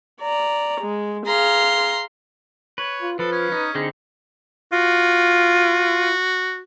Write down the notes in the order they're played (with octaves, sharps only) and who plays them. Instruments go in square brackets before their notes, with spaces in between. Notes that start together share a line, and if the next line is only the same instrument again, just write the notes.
[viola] D5 A#5
G#3
[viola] G#4 F5 [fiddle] A#5 C6
[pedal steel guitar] B4 [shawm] C#5
[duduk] F4
[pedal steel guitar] F3 [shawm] A4 [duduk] B4
[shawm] C#4
[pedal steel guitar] D#4
[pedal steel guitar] D3 C4 D#4 [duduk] G#4
[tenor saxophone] F4 [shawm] F#4